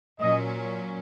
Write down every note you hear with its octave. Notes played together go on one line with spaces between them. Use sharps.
A#2 F#3 C#4 D#5